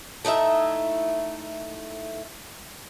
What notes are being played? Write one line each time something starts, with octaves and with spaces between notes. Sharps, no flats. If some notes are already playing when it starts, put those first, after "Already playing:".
A3 D#4 E4 E5